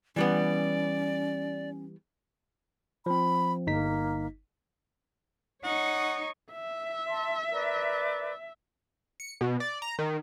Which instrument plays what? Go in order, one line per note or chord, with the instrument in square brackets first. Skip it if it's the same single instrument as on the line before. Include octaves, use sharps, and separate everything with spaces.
[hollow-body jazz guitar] E3 G3 B3 [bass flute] C#4 [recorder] D5
[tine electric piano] F3 C4 [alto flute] B5
[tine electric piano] G1 D#4 B6 [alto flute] A#3
[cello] D#4 [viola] C#5 C#6 [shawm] F#5
[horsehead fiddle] E5
[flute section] A5 C6
A#4 B4 D5
[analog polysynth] C#7
B2
D5
A#5
D#3